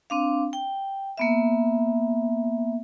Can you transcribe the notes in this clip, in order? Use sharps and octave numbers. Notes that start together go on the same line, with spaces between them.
C4 D4 F5
G5
A#3 B3 E5